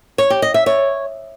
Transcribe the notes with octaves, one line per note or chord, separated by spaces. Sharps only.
C#5
G4
D#5
E5
C#5